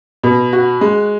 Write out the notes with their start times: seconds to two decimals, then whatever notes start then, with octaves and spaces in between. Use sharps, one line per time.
0.23 B2
0.53 F#4
0.81 G#3